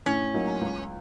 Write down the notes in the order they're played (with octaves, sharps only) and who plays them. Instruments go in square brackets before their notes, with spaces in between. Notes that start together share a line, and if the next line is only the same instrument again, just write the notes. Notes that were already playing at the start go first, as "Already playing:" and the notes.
[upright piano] A2 [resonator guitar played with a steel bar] C#4
[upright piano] F#3 A#3 D#4
C#2